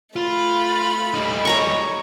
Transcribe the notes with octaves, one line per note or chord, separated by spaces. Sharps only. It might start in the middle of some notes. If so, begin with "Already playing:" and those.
A3 F4 B5
G3 D#4
C#5 A#5 C#6